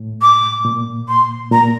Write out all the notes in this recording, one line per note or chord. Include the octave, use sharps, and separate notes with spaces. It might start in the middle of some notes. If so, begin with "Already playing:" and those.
Already playing: A2
D6
A#2
C6
A#2 A#5